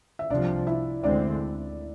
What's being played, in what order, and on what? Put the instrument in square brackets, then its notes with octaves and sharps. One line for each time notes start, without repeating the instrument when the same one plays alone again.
[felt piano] E5
[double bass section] C2 C3 F3 [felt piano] D4 D5
[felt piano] E4 E5
[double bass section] D2 D3 G#3 C4 [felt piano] D4 D5